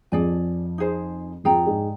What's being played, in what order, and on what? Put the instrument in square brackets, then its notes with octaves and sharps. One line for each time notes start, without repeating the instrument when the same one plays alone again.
[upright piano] F2 F3 [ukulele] G#4 D5 G#5
[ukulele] D#4 G#4 C5
[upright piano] F2 F3 [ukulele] G#4 D5 G5 A#5
[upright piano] G#2 G#3